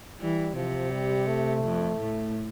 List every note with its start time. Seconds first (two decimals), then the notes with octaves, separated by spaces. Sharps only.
0.20 E3 G3
0.56 C3 F3
0.92 G3
1.27 A3
1.64 F2
1.99 A2